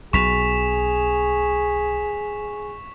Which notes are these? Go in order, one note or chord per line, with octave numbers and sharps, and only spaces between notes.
B1 B2 G#4 C#6 B6 F7